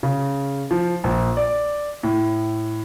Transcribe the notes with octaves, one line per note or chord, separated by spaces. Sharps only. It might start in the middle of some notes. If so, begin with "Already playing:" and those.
C#3
F3
A#1
D5
A2